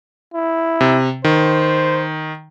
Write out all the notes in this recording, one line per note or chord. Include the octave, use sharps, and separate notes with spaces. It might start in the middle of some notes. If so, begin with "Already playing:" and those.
E4
C3
D#3 C5